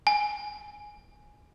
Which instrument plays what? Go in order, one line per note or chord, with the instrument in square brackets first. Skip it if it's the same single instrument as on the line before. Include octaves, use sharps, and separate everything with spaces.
[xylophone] G#5